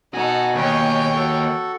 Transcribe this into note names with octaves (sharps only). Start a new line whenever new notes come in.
B2 D#4 F#4 A4 G#5
D#2 C#5 G5
F#4 A4